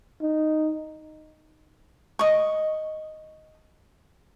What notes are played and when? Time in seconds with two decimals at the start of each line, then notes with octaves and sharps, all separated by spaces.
0.22 D#4
2.19 D#5 C#6